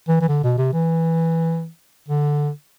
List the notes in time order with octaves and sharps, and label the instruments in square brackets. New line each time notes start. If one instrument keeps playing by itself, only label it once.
[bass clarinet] E3
E3
D3
B2
C3
E3
D3